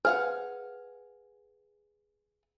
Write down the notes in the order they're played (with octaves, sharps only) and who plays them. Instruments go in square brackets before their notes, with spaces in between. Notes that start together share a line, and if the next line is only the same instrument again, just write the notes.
[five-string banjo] G#4 F5 F#5 [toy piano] B4